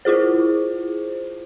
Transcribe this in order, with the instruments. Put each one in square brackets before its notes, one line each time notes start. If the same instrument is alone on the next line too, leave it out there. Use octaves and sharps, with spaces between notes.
[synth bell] E4 F4 G#4 C5